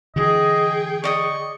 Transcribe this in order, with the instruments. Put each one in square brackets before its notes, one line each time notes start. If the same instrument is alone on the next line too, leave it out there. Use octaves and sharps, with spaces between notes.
[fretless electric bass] D3 E3 [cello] G#4 G5 [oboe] D#5
[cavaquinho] D5 D#5 D#6 [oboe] C#6